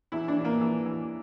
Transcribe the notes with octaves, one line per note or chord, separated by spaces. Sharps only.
E2 E4
D4
E3
A#3
E3
E3